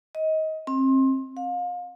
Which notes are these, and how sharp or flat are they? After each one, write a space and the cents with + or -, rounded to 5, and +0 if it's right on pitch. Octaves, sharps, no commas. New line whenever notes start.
D#5 +20
C4 +30
F5 +35